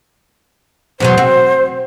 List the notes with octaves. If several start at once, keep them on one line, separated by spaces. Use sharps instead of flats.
E2 B2 F#3 C5
C4 F#4